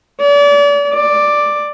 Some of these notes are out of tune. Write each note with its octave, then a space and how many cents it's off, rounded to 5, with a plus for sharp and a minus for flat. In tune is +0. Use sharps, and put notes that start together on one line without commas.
D5 -35
D5 +5